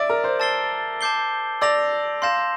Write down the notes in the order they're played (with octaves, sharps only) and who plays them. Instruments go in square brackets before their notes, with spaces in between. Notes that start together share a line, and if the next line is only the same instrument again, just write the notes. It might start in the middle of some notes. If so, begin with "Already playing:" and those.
Already playing: [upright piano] D5 E5 [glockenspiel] D6 A6 D7
[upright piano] A#4
C5
[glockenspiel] A5 E6 A6 C7 G7
A5 D6 G6 C7 G7
[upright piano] D5 [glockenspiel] E6 A#6 F7
[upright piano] F5 [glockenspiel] C6 G6 A#6 E7